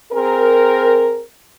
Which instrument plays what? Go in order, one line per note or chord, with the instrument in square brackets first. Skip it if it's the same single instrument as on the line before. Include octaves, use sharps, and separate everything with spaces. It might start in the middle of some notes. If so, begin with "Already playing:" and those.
[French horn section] C4 G#4 A#4